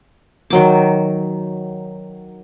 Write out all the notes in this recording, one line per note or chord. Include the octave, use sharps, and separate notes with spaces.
D#3 F#3 D6